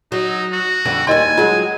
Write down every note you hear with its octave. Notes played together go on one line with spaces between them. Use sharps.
F#3 D#4
F#4
F2 D3 G3
D#2 G3 A#4 D#5 G#5 C6
F#3 G#3 F4